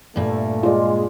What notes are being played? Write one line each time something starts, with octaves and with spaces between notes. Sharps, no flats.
G2 A#2 A3
G#3 F4 D5